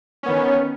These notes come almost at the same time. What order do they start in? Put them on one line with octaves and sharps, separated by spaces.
C#4 B3 D#3